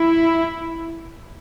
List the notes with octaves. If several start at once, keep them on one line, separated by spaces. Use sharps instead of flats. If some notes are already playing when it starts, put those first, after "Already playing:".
Already playing: E4